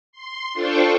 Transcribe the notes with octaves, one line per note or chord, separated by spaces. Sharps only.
C6
D4 F4 A4 C5 G5 C#6